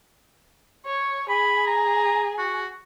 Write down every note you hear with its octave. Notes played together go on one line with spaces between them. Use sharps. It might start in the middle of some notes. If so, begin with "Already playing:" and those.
C#5
G#4 B5
A#5
F#4